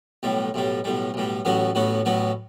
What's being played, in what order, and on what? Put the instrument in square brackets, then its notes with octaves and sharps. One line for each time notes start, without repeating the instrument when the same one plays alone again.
[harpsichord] B1 A2 G3
B1 A2 G3
B1 A2 G3
B1 A2 G3
A1 A2 F#3 B3 F#4
A1 A2 F#3 B3 F#4
A1 A2 F#3 B3 F#4